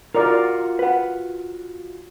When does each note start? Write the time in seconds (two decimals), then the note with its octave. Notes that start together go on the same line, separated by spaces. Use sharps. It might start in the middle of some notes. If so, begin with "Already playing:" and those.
0.15 F4 F#4 A#4 D5
0.79 B4 F#5